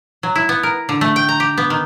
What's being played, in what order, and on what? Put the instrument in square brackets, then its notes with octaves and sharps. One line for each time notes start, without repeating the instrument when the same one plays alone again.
[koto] F#3
E4
B3
A#4
D3
A3
G5
A#5
G4
B3
D#3